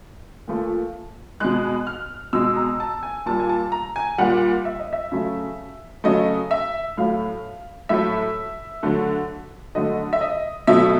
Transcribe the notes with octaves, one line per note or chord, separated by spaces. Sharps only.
A#2 F3 A3
B2 G#3 F#6
F6
B2 G#3 E6
A#5
A5
G#5
A#2 G3 A5
G#5
A5
A#5
G#5
A#2 G3 F#5
E5
D#5
E5
C#3 F#3 A3
C#3 F#3 A3 D#5
E5
A2 F#3 A3 F5
A2 F#3 A3 E5
D3 F#3 A3
D3 F#3 A3 D#5
E5
D#5
B2 F#3 A3 E5